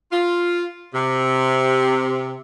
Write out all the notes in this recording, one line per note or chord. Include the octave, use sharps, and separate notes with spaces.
F4
C3